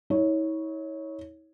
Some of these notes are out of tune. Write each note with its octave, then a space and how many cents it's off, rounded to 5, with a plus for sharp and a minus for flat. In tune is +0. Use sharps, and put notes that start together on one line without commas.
E4 -45 C#5 +0